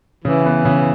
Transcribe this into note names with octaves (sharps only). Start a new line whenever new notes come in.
C#3 E3
B3
C#3